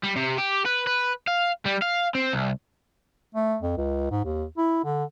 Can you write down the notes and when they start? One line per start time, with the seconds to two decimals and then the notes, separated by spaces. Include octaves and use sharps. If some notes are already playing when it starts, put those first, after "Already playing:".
0.03 G3
0.16 C3
0.38 G4
0.66 B4
0.87 B4
1.28 F5
1.66 G3
1.82 F5
2.15 C4
2.33 C2
3.35 A3
3.62 F2
3.77 C#2
4.11 G#2
4.25 D#2
4.58 E4
4.85 D3